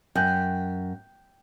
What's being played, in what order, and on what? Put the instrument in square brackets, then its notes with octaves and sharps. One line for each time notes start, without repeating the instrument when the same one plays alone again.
[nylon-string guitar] F#2 [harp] G5 F#6 G6